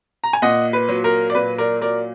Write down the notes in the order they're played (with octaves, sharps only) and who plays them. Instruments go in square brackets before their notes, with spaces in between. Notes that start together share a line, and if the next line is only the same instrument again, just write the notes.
[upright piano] A#5
G#5
A#2 D#5 F#5
B4
F#3
A#4
D5
A#2 B4
A#4 D5
F#3 A#4 D5